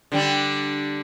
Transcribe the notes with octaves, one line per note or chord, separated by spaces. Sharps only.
D3 G3 D4